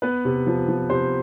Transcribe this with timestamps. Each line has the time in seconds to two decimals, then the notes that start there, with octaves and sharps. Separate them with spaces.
0.02 B3 B4
0.25 C3
0.47 F3
0.68 F3
0.90 C3 C5